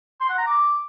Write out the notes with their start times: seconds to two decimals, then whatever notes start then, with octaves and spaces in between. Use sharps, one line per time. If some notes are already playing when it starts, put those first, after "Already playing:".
0.21 C6
0.29 F#5
0.38 A#5
0.47 D6